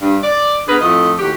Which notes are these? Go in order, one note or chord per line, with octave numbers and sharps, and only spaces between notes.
G2
D5
B3 D4 G#4 A#4 B4
F2 A2 F3 A3 D#5
D#2 A2 F#4 G4